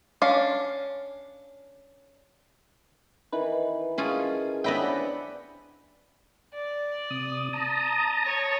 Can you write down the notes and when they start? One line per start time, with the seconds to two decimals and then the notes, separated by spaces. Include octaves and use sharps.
0.22 C#4 D4 F5
3.32 D#3 E3 B4
3.98 C#4 F4 G#4 A5
4.64 B3 C#4 D4 C5 D#5 E5 G5 B5
4.81 D5 F#5 G#5
6.54 D5
7.10 C3 D#6
7.53 A5 A#5 D#6
8.26 C#5